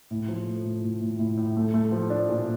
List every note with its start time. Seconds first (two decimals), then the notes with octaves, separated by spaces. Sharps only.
0.11 A2
0.28 F3
0.47 A3
0.64 A2
0.84 A2
1.01 A2
1.19 A2
1.37 A2
1.57 A3
1.74 A3
1.92 F3
2.10 D4
2.29 A#2